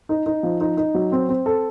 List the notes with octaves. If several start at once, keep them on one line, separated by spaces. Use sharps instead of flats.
D#4
D#4
F3
D#4
D#4
F#3
C4
C4
A4